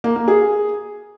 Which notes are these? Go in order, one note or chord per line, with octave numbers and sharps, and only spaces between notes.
A#3
A#3
G#4